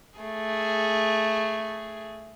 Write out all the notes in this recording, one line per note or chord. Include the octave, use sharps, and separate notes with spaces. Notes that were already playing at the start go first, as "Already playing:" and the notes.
A3 G#4